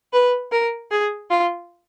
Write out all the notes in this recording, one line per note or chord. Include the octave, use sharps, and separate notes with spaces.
B4
A#4
G#4
F4